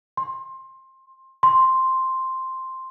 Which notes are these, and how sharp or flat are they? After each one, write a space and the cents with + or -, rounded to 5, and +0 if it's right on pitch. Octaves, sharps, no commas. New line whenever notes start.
C6 +20
C6 +0